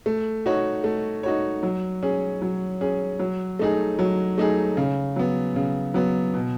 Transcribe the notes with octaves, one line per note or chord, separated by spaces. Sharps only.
A3
D#4 F#4 C#5
A3
D#4 F#4 C#5
F#3
C#4 G#4
F#3
C#4 G#4
F#3
A3 D#4 G#4
F#3
A3 D#4 G#4
C#3
F#3 B3
C#3
F#3 B3
B2